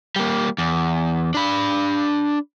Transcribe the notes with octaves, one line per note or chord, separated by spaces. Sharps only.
G3 A#3
E2
D4 B5